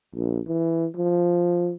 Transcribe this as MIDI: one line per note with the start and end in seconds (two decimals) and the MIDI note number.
0.15 0.40 34
0.48 0.86 52
0.96 1.73 53